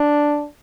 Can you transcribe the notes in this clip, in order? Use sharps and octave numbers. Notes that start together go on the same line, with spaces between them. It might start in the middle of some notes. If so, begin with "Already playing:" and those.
Already playing: D4